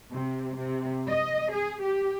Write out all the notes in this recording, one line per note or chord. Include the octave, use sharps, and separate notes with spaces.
C3
C3
D#5
G#4
G4